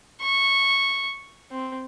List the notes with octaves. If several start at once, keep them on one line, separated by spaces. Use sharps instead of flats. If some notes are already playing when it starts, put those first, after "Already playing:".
C#6
C4